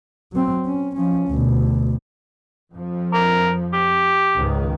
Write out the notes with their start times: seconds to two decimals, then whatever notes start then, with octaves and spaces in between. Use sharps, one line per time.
0.32 F#3 C4
0.65 C#4
0.96 F3 C#4
1.29 D2 B2
2.72 F2 F3
3.13 A#4
3.73 G4
4.35 C#2 G#2 D#3